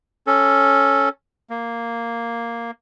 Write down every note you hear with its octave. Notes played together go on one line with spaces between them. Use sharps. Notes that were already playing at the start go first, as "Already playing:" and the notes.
C#4 A4
A#3